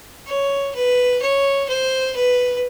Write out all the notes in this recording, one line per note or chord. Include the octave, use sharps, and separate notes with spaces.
C#5
B4
C#5
C5
B4